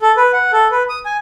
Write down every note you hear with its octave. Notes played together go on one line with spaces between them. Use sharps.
A4
B4
F#5
A4
B4
D#6
G#5